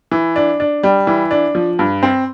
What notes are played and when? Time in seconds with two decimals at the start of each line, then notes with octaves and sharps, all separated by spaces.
0.11 E3
0.36 D4
0.60 D4
0.83 G3
1.07 E3
1.31 D4
1.55 F3
1.79 G2
2.03 C4